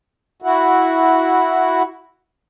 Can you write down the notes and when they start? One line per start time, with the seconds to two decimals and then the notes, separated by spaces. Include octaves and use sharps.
0.42 E4 F#4